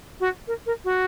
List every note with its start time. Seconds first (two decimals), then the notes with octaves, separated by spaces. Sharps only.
0.20 F#4
0.47 A#4
0.66 A#4
0.84 F#4